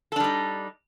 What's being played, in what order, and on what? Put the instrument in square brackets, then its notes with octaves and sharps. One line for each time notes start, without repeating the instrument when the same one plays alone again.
[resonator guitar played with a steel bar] A4
D4
G3
D#4